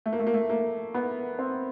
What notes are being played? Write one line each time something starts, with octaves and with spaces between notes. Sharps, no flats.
A3
A#3
A3
A#3
A3
A#3
B3
C4